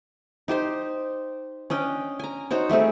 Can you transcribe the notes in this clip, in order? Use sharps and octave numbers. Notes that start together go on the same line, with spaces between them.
D#4 G4 C5 C6
C#4 D4 D#5 G5
G#5 A#5
D#4 F#4 C5 C#5
G3 A3 C4 G#4